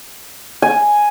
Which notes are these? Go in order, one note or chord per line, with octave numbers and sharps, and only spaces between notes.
G#5